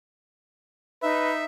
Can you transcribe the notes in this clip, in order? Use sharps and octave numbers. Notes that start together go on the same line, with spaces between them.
D#4 B4 E5